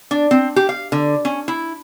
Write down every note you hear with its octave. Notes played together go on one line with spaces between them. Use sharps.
D4
C4
G4
F5
D3
C#4
E4